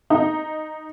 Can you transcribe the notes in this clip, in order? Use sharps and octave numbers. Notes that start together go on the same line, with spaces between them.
D#4